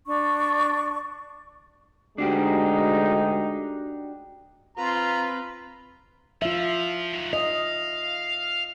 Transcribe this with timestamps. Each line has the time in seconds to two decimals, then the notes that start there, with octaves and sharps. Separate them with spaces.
0.07 D4 C#6
2.18 D2 G#3 D4 D#4 F#4 G4
4.77 C4 F4 B4 A#5
6.42 F3 F4 E5
7.13 D#3 F#3
7.33 D#5 F5